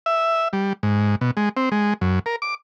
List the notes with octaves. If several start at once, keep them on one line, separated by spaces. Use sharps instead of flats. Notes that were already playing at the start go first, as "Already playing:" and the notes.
E5
G3
G#2
B2
G#3
C4
G#3
F#2
A#4
D6